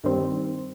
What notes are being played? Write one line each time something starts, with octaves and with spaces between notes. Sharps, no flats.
G2 D#3 G3 C4